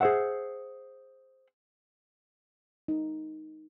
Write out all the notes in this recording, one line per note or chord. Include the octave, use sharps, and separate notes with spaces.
G#4 C5 C#5 E5 F#5
D#4